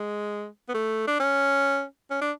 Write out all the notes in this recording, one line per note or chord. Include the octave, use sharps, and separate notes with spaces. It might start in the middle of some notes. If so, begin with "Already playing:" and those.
Already playing: G#3
B3
A3
D4
C#4
C#4
D4